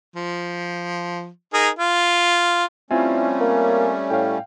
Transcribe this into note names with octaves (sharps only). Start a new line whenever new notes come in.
F3
D#4 G#4 A#4
F4
G3 A3 C4 C#4 E4 F4 G#5
A#3
A2 F5 G5